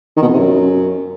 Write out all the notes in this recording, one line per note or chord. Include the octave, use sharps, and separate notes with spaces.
D#3
B2
F2
C3
F#2